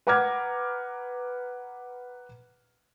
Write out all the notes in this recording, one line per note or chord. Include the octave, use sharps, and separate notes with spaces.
B4 F#5 A#5 D6 F6 G#6